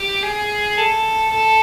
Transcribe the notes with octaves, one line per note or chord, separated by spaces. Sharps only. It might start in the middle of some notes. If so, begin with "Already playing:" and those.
Already playing: G4
G#4
A4
A4